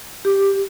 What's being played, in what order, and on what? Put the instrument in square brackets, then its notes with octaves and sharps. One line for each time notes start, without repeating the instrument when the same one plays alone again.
[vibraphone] G4